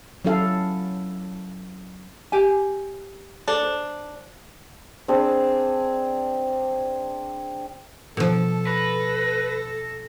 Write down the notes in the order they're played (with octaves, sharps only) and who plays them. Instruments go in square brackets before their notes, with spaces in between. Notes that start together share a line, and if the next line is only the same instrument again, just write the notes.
[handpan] F#3 C#4 E4 A4 F5
[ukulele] G4 G#5
[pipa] D4 [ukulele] A4
[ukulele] C5
[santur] C4 D4 G#4
[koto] B2 F3 [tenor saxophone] A4
[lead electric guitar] B4 [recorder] A#6